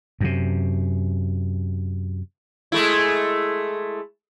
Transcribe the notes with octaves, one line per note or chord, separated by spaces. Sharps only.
F#2 C3
G#3 A3 E4